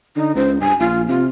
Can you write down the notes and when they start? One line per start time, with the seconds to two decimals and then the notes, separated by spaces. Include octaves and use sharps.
0.17 D3 D#4
0.36 C#2 C5
0.61 G2 G#5
0.80 A#1 F4
1.08 C3 F4